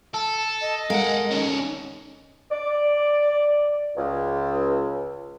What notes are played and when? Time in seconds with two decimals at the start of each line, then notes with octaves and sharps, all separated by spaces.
0.14 A4 A5
0.61 D#5
0.90 G#3 A4 A#4 F5 F#5
1.31 D#3 C#4
2.51 D5
3.97 C#2